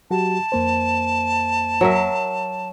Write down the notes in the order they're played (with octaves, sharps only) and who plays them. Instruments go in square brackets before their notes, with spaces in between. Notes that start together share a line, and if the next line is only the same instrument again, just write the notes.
[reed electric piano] F#3 F#4 G4 [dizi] A5
[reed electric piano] F2 A#3 C5
[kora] F#3 A#4 E5